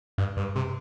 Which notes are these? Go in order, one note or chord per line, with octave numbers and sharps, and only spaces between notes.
G2
G2
C3